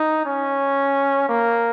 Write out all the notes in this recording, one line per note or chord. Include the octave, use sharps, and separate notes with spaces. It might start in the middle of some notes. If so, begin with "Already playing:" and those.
Already playing: D#4
C#4
A#3